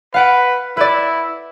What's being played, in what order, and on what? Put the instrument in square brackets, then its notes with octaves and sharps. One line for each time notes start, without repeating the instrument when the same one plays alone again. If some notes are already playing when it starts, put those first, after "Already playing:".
[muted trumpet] B4 [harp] F5 F#5 D7
[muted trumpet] E4 [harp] B4 D5